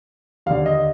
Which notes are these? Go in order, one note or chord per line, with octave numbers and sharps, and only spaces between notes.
D#2 D3 F5
D#5